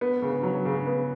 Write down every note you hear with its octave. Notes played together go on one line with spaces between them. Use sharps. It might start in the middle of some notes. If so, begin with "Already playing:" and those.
B3
C#3
F#3
C#3
B3